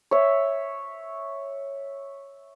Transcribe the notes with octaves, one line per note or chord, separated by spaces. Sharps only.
C#5 E5